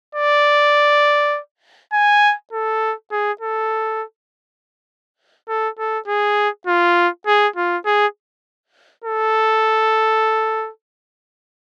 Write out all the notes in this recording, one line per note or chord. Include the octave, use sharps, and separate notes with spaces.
D5
G#5
A4
G#4
A4
A4
A4
G#4
F4
G#4
F4
G#4
A4